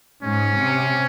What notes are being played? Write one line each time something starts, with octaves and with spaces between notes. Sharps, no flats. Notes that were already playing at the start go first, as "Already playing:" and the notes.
G#2 C#4
C3